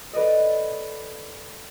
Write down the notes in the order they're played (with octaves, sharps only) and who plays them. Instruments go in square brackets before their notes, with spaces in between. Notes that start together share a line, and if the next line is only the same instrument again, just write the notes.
[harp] A4 B4 D5 D#5